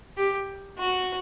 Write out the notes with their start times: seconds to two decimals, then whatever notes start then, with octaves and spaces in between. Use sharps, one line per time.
0.17 G4
0.78 F#4